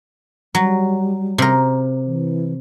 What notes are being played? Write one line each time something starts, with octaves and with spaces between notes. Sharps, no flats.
F#3 G3
C3 A#4
E3